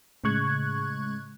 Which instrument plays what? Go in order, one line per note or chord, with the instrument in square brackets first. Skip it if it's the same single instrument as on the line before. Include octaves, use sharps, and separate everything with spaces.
[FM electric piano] A2 C#3 G#3 C#6 F#6 G#6